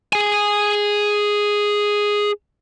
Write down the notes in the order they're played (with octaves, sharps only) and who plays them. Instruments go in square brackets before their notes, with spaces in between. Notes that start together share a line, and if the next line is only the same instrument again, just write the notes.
[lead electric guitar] G#4 G#5